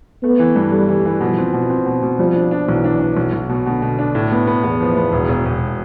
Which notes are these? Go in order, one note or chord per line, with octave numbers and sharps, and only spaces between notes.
A3 B3
E3
G2
G3 A3
E3
E3
B2 F3
C4
B2
C4
B2
B2
F3 G3
D4
D4
B1 E3
D4
D4
B1
B1
B2
B2 D3
B2
D4
A2
B3
B3
E2 B3
F3
B3
E1
E1
E1